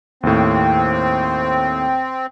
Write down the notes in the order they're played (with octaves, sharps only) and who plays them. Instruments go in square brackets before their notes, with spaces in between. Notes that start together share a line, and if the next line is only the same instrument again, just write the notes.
[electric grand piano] D#2 A2 [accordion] C4